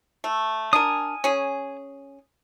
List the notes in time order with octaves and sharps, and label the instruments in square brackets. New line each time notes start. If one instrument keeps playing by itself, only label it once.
[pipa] A3
[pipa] D4 A#4 [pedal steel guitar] G#5 D#6
[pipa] C#4 G#4